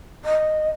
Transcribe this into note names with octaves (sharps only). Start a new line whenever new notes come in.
D#5